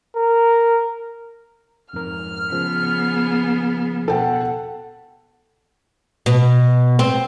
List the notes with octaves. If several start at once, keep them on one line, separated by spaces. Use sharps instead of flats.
A#4
F2 G#2 A#4 F6
C#3 F3 B3 G#4
B2 A4 F#5 G5
B2
C4